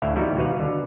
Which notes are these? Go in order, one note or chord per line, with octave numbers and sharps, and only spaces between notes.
D2 A2 E4 E5 F5
E3 G3 B3 D#4 E4 F#4
D#2 B2 F#4 B4 F5
D3